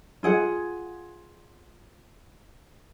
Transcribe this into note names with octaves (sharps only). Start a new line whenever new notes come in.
F4 G#4 F#5